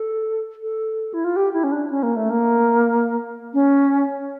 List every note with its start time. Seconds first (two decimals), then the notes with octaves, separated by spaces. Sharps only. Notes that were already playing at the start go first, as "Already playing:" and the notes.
Already playing: A4
0.62 A4
1.13 E4
1.24 F4
1.36 G4
1.53 E4
1.64 C#4
1.72 D4
1.90 C#4
2.03 A#3
2.16 A3
2.30 A#3
3.54 C#4